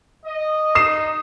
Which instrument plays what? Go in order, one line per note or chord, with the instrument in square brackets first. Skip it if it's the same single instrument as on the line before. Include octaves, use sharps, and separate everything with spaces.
[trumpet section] D#5
[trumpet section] D#4 [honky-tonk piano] D#6 C7 E7